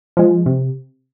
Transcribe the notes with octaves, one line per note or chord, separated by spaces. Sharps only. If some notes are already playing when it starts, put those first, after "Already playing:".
F3 G#3
C3